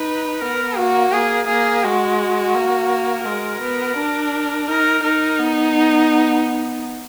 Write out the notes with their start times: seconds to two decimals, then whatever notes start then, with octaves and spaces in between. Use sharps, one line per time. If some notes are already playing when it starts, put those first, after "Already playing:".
Already playing: D#4 B4
0.41 B3 A#4
0.76 A#3 F#4
1.12 A#3 G#4
1.47 A#3 G#4
1.83 G#3 F#4
2.55 A#3
3.25 G#3 A#4
3.61 B3
3.97 D4
4.68 D#4 A#4
5.03 D#4 A#4
5.39 B3